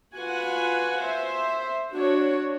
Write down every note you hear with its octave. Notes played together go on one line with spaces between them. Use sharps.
F4 F#4 B4 F#5 G#5
C5 E5
D4 F#4 C#5